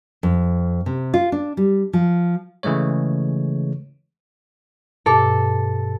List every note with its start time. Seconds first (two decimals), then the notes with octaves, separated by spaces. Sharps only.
0.23 F2
0.86 C3
1.14 F4
1.32 D4
1.57 G3
1.93 F3
2.63 C#3 E3 G#3 A3 C#5
5.06 G2 B2 A4 D6